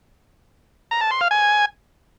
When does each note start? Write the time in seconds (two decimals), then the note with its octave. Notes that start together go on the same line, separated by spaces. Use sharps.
0.91 A#5
1.01 A5
1.11 C6
1.21 F5
1.31 G#5